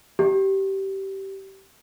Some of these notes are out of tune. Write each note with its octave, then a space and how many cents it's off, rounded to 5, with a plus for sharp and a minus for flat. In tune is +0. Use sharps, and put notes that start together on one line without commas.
G4 -20